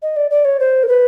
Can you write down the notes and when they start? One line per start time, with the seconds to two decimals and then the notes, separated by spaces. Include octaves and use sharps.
0.02 D#5
0.17 D5
0.31 D5
0.45 C#5
0.60 C5
0.83 A#4
0.88 B4